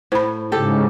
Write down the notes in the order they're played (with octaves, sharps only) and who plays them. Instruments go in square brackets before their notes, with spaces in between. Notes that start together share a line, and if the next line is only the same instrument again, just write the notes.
[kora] A2 [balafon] C5 B5
[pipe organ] G#2 C#3 [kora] G4 A4